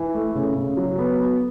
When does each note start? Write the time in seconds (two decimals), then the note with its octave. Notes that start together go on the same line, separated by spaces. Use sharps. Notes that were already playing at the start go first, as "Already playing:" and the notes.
Already playing: E3
0.14 A3
0.35 C#3
0.56 C#3
0.77 F#3
0.98 B3
1.19 B3